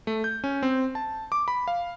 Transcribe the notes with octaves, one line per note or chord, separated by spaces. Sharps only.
A3
G6
C#4
C4
A5
D6
B5
F5